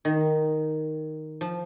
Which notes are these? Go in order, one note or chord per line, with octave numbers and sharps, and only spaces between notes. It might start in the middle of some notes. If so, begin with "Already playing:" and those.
D#3
F3